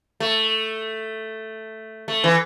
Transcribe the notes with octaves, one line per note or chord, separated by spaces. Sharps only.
A3
A3
E3